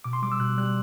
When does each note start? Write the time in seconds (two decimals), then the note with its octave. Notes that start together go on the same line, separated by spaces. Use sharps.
0.04 B2 D6
0.13 C6
0.22 G3 D6
0.32 E6
0.39 B2 F#6
0.58 G3 F#6